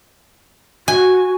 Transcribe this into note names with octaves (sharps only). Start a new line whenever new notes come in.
F#4 G#5